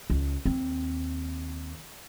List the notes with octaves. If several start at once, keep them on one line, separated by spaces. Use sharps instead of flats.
C#2
D#2 C4